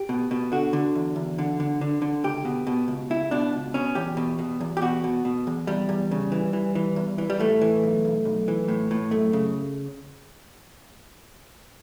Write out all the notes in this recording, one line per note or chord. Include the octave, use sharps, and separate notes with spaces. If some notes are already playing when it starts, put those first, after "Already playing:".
Already playing: G4
B2
B2
D3 F#4
D3
E2
E2
D3
D3
D3
D3
C#2 G4
B2
B2
C#2
C#2 E4
B2 D4
C#2
B2 C#4
E2 G4
B2
B2
E2
G4
B2 F#4
B2
B2
E2
E2 G3
E2
C#3
E3
E3
E3
E2
E3
G3
A2 A3
E3
B1
B1
B1
E3
A2
A2
F#2 A3
C#3